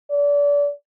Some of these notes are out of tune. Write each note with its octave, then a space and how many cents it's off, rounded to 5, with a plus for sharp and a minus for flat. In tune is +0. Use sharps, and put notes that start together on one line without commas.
D5 -30